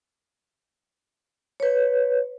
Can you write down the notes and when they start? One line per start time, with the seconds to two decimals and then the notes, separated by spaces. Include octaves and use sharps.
1.60 B4 C#5